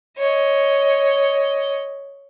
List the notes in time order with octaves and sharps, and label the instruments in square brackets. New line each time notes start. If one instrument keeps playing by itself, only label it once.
[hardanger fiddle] C#5 D#5